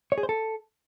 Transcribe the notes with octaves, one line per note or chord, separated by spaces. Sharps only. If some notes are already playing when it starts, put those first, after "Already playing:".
C#5
G#4
C5
A4